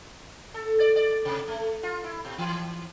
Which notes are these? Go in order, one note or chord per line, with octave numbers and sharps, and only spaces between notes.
A4
D5
D5
C3
A3
F4
E4
B2
E3